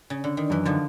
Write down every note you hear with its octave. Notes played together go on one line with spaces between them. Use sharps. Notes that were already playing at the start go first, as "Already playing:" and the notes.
C#3
D3
D#3
F#2 E3
D3 D#3 F3